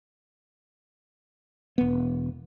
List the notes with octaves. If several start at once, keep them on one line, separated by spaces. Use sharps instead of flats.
E1 B3